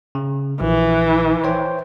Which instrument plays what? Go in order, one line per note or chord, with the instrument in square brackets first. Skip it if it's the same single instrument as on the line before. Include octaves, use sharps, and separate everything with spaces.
[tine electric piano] C#3
[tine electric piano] A#1 [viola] E3
[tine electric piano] C5 C#5 G5